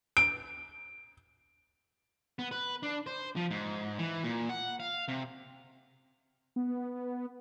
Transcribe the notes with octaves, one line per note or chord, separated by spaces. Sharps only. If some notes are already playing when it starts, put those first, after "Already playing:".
D7
B3
B4
D4
C5
F3
G#2
E3
A#2
F#5
F5
C3
B3